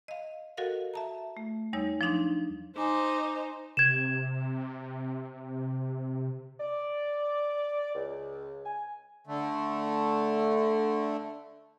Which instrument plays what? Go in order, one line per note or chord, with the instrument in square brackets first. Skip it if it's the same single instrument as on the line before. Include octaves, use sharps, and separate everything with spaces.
[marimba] D#5 F5
F#4 A4 A#4 D#5 F5 F#5
E5 A5 A#5
A3
E2 G3 D#4 C#5 E6
F3 F#3 D4 D#4 F5 C6
[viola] D#4 C5 [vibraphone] G#5 D6
[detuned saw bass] C3 [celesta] G#6 E7
[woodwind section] D5
C#2
G#5
[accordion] D3 A3